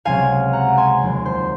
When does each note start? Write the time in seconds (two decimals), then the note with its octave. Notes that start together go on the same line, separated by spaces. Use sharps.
0.05 C#2 C3 F#3 F5 G#5
0.53 F#5 A#5
0.77 G#5 C6
1.01 F1 D#2 D#3 F#3
1.26 C5